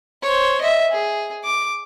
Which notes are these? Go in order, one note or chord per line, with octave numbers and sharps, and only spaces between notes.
C5 C#5
D#5 E5
G#4
D6